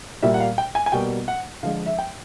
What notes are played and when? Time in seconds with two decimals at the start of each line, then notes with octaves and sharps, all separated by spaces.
0.23 A#2 G3 A#3 E5
0.34 F#5
0.40 F5
0.58 G5
0.75 G#5
0.86 G#5
0.92 B2 G3 A#3 G5
1.28 F#5
1.63 D3 F3 G#3 F5
1.86 E5
1.99 G5